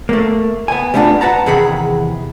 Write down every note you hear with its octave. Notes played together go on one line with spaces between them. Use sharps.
A3 A#3
B3 G#5
G3 A3 B3 C4 D4 F4
B4 F#5 A5 A#5
E2 C3 D#3 G#4 F#5 B5